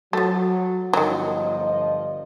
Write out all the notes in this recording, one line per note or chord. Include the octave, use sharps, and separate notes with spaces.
F3 F#3 A3
G1 D#3 F3 F#3 D#5